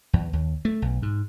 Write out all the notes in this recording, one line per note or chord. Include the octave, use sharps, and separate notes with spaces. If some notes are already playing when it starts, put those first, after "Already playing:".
E2
D#2
A3
B1
G#2